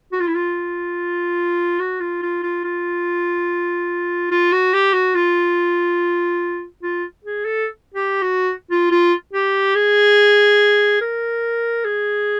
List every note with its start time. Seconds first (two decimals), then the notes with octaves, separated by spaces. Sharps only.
0.12 F#4
0.20 F4
0.27 E4
0.35 F4
1.80 F#4
2.00 F4
2.22 F4
2.43 F4
2.64 F4
4.31 F4
4.52 F#4
4.74 G4
4.94 F#4
5.15 F4
6.83 F4
7.24 G#4
7.45 A4
7.94 G4
8.22 F#4
8.71 F4
8.91 F4
9.33 G4
9.75 G#4
11.01 A#4
11.85 G#4